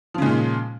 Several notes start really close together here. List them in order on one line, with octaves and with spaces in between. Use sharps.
F3 C#3 G#3 A#2